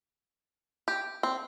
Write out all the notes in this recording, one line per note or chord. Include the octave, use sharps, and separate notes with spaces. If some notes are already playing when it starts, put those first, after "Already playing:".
G4
C4